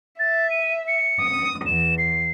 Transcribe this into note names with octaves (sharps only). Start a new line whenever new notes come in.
E5 A6
D#7
C#7
D#6
E2 E7
C7